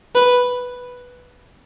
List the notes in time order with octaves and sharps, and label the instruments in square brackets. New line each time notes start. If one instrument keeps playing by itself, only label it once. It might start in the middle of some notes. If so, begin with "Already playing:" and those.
[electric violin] B4